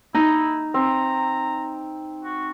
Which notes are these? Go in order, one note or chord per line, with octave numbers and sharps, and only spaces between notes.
D#4 E4
C4 A#5
F#4